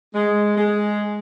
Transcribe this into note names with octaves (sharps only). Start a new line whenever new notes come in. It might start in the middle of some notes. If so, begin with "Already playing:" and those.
G#3
G#3